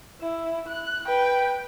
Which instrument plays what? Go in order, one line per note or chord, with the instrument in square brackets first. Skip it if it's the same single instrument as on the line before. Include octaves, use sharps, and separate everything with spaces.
[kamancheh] E4
F#6
B4 G5